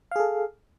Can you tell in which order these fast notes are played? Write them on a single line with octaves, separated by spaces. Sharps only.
F5 G#4 A4